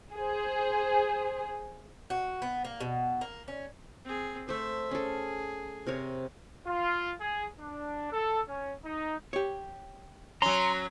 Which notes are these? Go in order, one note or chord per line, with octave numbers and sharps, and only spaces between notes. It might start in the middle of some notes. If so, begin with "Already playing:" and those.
G#4 C5
F#4
B3
A#3
B2
A#3
C#4
C4 G#4
A3 A4 C5 E5
C#4 G#4 A4
C3 A#4 C#5
F4
G#4
D4
A4
C#4
D#4
G4 C#5
F#3 C#4 A#5 C6